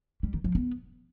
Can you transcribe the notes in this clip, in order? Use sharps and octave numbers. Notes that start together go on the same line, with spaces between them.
G3
D#3
F3
B3